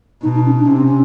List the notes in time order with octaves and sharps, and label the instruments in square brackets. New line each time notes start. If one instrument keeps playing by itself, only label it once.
[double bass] B2 [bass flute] D#4
[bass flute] D#4
C#4
D4
[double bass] C3 [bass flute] C#4
[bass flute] C4
C#4